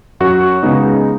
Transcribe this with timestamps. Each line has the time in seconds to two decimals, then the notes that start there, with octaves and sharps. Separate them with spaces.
0.20 F#2 F#4
0.63 C#3 G#3 B3 D#4